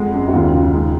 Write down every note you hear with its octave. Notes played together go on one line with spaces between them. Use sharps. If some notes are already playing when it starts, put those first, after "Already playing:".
Already playing: F2 G#3 F#4
F#2
F#4
D#2 F4
C#3
F4
G#3 D#4